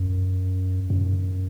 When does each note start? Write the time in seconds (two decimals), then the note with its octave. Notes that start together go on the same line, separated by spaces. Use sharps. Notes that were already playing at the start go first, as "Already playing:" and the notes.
Already playing: F#2
0.90 F#2